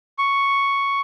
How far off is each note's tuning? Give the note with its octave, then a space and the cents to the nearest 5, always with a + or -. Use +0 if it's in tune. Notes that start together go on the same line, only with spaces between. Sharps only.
C#6 +0